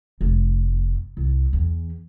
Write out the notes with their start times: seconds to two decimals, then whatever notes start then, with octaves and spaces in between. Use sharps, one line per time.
0.21 F1
1.17 C2
1.53 E2